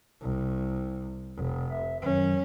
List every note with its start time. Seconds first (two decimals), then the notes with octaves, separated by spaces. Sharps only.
0.21 C2
1.36 F1
1.70 E5
2.02 F#2 D#3 F#3 C#4